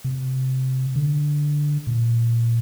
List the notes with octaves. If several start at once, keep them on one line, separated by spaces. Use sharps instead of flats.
C3
D3
A#2